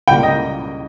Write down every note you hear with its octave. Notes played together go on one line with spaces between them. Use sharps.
C#2 C#3 G3 A#3 G5
D#5